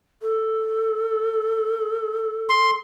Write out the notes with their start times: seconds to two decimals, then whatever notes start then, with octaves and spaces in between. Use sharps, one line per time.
0.22 A4
2.49 C6